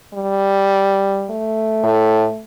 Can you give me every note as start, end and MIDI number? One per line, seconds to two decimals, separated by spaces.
0.14 1.32 55
1.30 2.44 57
1.84 2.26 45